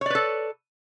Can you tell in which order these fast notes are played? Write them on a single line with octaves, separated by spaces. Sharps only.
C#5 D5 B4 A4